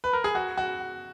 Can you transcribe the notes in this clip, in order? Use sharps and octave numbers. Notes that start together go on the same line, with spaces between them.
B4
A#4
G#4
F#4
F#4